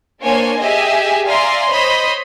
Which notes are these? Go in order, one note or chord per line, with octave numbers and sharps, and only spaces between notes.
A#3 D4 C5 C#5 G#5
G4 G#4 D#5 E5 G#5
D5 E5 F5 G#5 A#5 C6
C5 C#5 D#5 B5